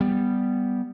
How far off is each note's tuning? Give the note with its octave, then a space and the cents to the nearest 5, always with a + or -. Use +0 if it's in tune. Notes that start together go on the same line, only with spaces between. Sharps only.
G3 +0 B3 +0